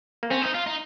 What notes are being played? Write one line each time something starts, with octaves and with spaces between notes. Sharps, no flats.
A#3
C4 C#4
D#4
F4
D#4